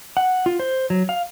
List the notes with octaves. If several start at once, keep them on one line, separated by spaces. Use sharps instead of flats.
F#5
F4
C5
F#3
F5